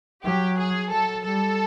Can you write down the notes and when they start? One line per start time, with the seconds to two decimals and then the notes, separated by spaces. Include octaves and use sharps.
0.24 F#3 G4
0.58 G#4
0.91 F#3 A4
1.25 G3 A4